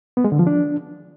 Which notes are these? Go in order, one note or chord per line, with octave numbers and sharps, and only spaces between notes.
B3
G#3
D3
F3
D4